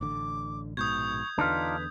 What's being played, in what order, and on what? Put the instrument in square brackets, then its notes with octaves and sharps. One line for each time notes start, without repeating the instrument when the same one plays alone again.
[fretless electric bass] A1 D3 [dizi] D6
[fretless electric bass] A#1 G#2 B2 [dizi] C#6 [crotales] D#6 G6 G#6
[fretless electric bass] E2 D3 [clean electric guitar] D4 D#4 F4 [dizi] B4